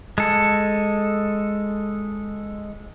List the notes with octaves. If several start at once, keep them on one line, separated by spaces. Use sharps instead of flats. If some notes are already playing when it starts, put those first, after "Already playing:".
G#3 A4